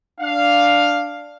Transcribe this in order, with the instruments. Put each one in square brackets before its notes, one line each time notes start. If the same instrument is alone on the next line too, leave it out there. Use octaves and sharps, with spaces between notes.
[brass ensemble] D4 F5